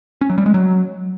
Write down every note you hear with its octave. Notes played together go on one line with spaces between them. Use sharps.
C#4
F#3
G3
G#3
F#3